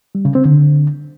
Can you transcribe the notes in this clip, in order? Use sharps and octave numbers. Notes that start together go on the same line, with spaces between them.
G3
C#3
C4
D3